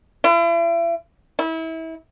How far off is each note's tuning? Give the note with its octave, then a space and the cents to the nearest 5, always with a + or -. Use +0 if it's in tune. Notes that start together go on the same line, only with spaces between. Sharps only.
E4 +40
E4 -30